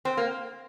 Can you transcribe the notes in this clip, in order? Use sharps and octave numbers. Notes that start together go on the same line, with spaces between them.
C4
A#3